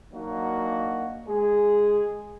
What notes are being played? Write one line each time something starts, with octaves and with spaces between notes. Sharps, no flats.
F#3 A#3 D4 D#4 F#4
G#3 G#4